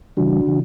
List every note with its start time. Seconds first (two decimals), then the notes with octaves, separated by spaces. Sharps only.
0.17 C#3 E3 G3 D4 F#4
0.47 C#3 E3